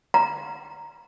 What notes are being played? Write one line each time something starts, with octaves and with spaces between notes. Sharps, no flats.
A#5